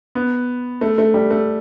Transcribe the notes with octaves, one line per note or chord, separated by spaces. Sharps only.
B3
A3
A3
G3
A3